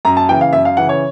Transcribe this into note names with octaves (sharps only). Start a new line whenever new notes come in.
F#2 A#5
A5
C#3 E3 G5
F5
F#2 E5
F5
C#3 E3 F#5
C#5